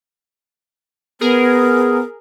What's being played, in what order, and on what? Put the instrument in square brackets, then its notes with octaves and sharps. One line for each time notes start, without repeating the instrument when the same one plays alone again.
[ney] B3 [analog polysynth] G#4 A#4